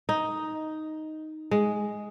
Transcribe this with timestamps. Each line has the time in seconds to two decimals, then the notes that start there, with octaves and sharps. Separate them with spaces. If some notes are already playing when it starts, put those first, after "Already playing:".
0.09 D#4
1.51 G#3